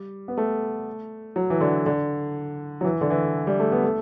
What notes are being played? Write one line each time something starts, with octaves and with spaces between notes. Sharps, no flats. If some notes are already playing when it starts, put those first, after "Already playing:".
Already playing: G3
B3
A3
F#3
E3
D3
D3
F#3
E3
D3
E3
G3
A3
B3
A3